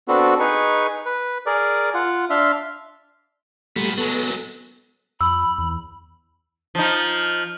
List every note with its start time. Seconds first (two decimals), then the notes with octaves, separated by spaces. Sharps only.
0.08 B3 C4 D4 F#4 A4
0.40 D#4 G#4 B4 C#6
1.05 B4
1.46 G#4 A#4 D5
1.94 F4 F#5
2.30 D4 E5 F5 C6
3.76 A#2 G3 A3 B3
3.98 F#3 G#3 B3 A4
5.21 F2 B5 E6
5.58 E2
6.75 F3 D#4